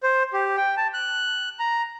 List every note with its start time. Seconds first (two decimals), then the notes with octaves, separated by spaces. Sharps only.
0.03 C5
0.33 G4
0.57 G5
0.77 A5
0.94 F#6
1.59 A#5